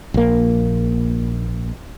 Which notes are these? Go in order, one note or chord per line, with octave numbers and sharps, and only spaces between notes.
A#1 A#3